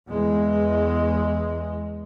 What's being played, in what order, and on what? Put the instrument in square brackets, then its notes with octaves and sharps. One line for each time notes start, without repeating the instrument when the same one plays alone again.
[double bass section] E2 G#3